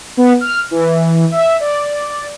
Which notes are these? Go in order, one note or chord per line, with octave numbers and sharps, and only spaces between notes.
B3
F6
E3
E5
D5